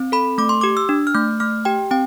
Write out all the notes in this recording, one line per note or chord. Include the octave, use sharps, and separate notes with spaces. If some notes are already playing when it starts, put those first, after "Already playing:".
Already playing: C4
A4 B5
A3 D6
C6
G4 D6
E6
D4
F6
A3 G6
A3 F6
G4 G5
C4 G5